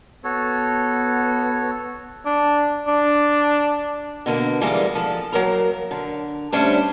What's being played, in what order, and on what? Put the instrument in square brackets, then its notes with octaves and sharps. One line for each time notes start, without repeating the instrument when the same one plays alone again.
[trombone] B3 [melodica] F#4 A4 C#5
[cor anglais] D4
D4
[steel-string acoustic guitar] B2 D3 A#3
D3 E3 G3 G#3 A#3 F4
F3 A4
F#3 A#3 A#4 A#5
D3
D3 G3 A3 C#4 D4 C5